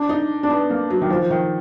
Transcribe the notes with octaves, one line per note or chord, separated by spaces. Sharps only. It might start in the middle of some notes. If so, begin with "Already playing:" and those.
Already playing: D4
D#4
D4
B3
A#3
F#3
D#3
F3
D#3